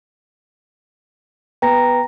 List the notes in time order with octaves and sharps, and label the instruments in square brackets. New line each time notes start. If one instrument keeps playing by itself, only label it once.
[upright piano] B3 [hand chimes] G5 A#5 A#6